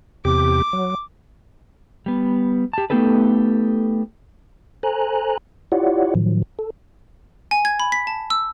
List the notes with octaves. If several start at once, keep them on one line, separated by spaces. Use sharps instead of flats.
E2 C3 G4 D6
F#3
G3 B3
G4 A5
A3 B3 D#4 G4 A4 B4
A4 C5 G#5 A#5 F#6
E4 F4 G4 C#5 D5 F#5
A2 D#3 F3 F#3
A4
G#5
G#6
B5
B6
A5
E6